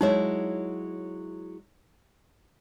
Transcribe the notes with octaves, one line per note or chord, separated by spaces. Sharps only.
F#3 G#3 D#4 E4 C#5